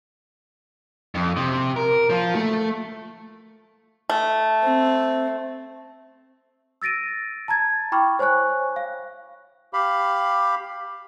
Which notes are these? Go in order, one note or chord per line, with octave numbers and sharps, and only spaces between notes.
F2
C3
A#4
F3
A3
A3
C4
E6 A6 A#6 D7 D#7
A5 A#5 G#6 A6
E4 G5 B5 C#6 D6 F6
C5 C#5 G#5 C#6 F#6
F5
G4 F5 B5